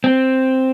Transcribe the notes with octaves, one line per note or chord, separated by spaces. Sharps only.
C4